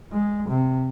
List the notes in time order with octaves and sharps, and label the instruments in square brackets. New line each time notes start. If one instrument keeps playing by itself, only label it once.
[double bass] G#3
C3